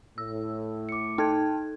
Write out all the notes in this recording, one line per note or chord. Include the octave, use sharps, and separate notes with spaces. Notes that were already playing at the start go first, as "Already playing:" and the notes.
A2 E6
D6 C#7
D#4 A4 G5 A5 F6 G#6